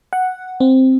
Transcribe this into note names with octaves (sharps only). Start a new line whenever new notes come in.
F#5
C4